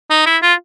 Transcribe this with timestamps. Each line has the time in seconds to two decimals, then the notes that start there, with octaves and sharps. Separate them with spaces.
0.10 D#4
0.26 E4
0.42 F4